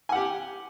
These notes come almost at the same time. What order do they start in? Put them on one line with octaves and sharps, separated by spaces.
G#5 F#5 G4